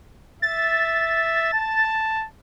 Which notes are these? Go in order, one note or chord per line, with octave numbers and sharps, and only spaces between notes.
E5 A6
A5